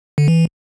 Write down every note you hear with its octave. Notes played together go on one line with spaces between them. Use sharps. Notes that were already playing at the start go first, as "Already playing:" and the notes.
D3
E3